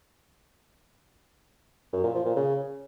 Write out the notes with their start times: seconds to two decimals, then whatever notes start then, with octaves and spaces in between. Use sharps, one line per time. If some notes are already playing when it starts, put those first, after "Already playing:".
1.93 F#2
2.04 A#2
2.14 F3
2.25 A#2
2.36 C#3